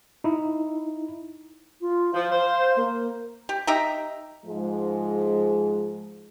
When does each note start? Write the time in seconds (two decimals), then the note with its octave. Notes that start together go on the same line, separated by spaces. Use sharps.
0.24 D#4 E4
1.81 F4
2.13 F3 F5
2.30 C5
2.76 A#3
3.49 G4
3.67 D#4 G4 E5 A#5
4.46 G#2 F3 G#3